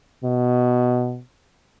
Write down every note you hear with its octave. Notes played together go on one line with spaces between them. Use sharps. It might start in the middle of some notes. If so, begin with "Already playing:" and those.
B2